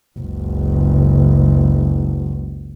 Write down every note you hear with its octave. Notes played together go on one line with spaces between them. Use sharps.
F#1 C#2